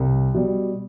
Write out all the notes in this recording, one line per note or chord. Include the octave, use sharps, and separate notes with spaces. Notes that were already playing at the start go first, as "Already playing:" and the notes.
Already playing: C2
B2 G3